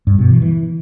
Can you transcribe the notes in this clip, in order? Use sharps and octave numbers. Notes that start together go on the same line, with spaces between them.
G2
B2
E3
E3